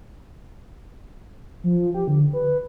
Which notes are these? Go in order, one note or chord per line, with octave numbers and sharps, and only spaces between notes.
F3
G4
D3
B4